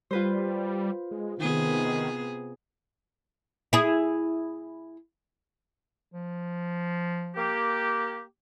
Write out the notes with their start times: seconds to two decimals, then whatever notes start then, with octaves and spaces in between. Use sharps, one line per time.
0.11 G3 F4 B4 C5
1.11 G#3
1.40 C3 D#3 B3 G#4
3.73 E4 G#4
6.13 F3
7.36 A#3 G4